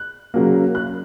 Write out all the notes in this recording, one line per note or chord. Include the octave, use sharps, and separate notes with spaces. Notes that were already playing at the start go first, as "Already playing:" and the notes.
Already playing: F#6
C#3 F#3 A#3
F#6